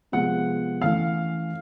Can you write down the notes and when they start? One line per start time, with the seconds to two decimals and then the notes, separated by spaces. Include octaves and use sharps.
0.12 C3 F3 G#3 B3 F#5
0.81 E3 A3 C#4 F5